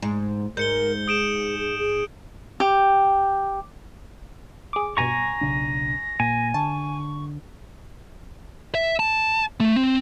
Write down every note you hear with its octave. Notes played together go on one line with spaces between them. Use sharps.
G#2
G#2 A#4 G6 C#7 G7
G#4 D#6 D7 E7
G#4
G#4
G4
G#4 D6
G2 B2 G#5 A#5 C#6 A#6
B1 C#3 D4
A#2 G#5
D3 A5 C#6
E5
A5
A3
C4